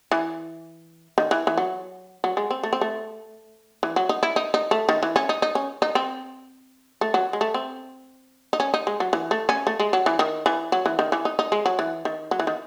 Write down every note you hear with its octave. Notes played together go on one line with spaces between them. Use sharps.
E3
D#3
E3
E3
F#3
F#3
G#3
C4
A3
C4
A3
E3
F#3
D#4
E4
D#4
D#4
A3
D#3
E3
C#4
D#4
D#4
C#4
D#4
C4
A3
F#3
G#3
A3
C4
D#4
C#4
D#4
G#3
F#3
E3
A3
C#4
A3
G#3
F#3
E3
D#3
E3
F#3
E3
D#3
E3
D#4
D#4
G#3
F#3
E3
D#3
F#3
E3
D#3